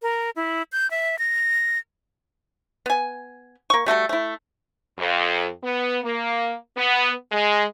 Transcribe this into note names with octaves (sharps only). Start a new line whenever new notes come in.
A#4
E4
G6
E5
A#6
B3 G#5
A#3 C#6
G3 A3 F#4 A4
A3 E4
F2
B3
A#3
B3
G#3